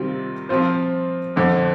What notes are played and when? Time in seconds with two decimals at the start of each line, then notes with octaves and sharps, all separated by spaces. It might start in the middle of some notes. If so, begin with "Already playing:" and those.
Already playing: C3 D#3 G3 C4 F4
0.49 F3 C4 F4 C5
1.36 F2 D3 F3